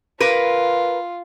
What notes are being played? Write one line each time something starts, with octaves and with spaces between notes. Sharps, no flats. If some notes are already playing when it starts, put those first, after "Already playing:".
F4 A#4 B4